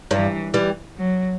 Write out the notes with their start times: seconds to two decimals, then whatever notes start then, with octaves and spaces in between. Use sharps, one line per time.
0.11 G2 E3
0.54 E3 G3
0.96 F#3